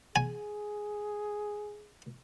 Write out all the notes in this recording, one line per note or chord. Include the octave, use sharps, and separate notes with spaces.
G#4 G#5